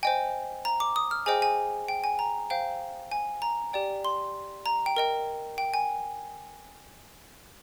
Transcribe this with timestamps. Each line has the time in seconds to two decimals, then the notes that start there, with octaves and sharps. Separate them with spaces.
0.03 C5 D#5 G5 G#5
0.65 A#5
0.80 D6
0.96 D#6
1.11 F6
1.26 G#4 C5 D#5 G5 G#5
1.42 G#5
1.88 G5
2.04 G#5
2.19 A#5
2.50 C5 F5 G5
3.11 G#5
3.42 A#5
3.73 G4 D5 G5
4.05 C6
4.66 A#5
4.86 G5
4.96 A#4 D#5 G5
5.58 G5
5.74 G#5